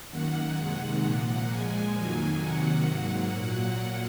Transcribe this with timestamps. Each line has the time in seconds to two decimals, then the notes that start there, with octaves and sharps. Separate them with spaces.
0.10 F#2 D#3 A#3 F#5
0.57 C3 D#3 G#3
1.03 A#2 F3 A#3 F#5
1.49 A#2 F3 G#3 G#5
1.95 F2 D#3 F#3 A#3
2.41 C3 D#3 F#3 A#3 F#5
2.87 G#2 F#3 A#3
3.33 A#2 F#3 A#3